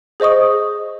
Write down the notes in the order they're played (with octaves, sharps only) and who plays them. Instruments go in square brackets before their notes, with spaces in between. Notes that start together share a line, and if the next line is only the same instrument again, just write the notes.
[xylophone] G#4 C5 D#5 C#6 D#6